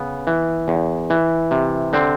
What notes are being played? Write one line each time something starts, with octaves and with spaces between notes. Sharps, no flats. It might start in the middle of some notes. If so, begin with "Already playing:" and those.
Already playing: C#3 B3
E3
E2
E3
C3
D3 C4